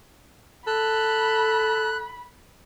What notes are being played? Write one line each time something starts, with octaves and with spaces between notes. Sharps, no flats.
A4 B5 F#6